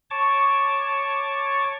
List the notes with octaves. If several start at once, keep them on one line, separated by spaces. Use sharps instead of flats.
C#5 A5 C#6 D6